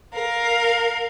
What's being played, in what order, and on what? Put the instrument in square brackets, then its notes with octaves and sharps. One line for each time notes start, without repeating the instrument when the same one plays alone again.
[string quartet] A#4 F5